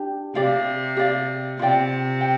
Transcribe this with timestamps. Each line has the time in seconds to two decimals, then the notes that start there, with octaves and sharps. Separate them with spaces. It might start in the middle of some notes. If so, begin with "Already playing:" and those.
Already playing: D4 G4
0.35 C3 G4 D5 F5
0.97 G4 D5 F5
1.59 C3 F4 D5 G5
2.21 G5